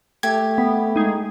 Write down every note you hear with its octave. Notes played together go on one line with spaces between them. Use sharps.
A3 G4 G#6
B3
G#3 D#4 G#4